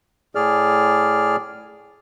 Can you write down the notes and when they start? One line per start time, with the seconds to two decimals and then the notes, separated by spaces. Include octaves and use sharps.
0.35 A2 G#4 D5 F6